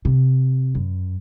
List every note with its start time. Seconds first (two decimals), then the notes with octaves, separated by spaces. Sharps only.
0.05 C3
0.75 F#2